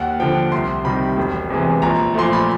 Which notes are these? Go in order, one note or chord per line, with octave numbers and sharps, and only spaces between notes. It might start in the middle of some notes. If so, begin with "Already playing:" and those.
Already playing: D#2 F#5
D3 F3 G5
C2 C6
C3 D#3 G3 B5
E1
E2 C3 E3 G#3
A#1 A#5
A#2 F3 A3 C6
B5